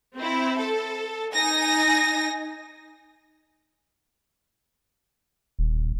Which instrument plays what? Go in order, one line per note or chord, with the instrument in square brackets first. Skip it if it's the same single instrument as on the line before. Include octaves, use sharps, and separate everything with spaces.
[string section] C4 E4
A4
D#4 G#5 A#6
[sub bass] D#1